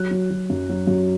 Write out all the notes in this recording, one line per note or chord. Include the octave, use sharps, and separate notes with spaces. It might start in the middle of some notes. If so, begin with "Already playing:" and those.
Already playing: F#3 F#6
F#3
F#3
F#2
F#3
F#2